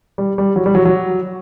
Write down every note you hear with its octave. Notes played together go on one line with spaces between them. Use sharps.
G3
G3
F#3
G3
F#3
F#3